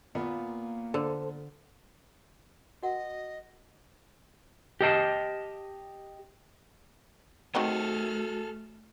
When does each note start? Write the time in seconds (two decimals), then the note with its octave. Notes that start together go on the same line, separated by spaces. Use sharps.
0.15 A#2 A#3 B3
0.94 D3 A4 C5
2.83 F#4 A#4 D#5 F#5
4.81 G4 D#5 A5
7.55 D#3 F#3 A3 C4 F#4 G#4 A4 F6